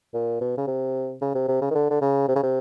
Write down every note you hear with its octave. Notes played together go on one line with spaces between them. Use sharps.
A#2
B2
C#3
C3
C#3
C3
C3
C#3
D#3
D3
D3
C#3
C3
C#3
C3